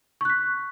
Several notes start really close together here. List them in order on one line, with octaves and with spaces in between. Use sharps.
C#6 F#6 B6